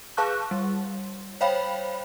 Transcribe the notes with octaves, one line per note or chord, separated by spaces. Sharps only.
G#4 B4 F5 A5 C#6 F#6
G3
C5 C#5 F5 G5 B5